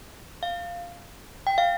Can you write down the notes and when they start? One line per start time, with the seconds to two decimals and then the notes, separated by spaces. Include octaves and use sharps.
0.43 F5
1.47 G5
1.58 F5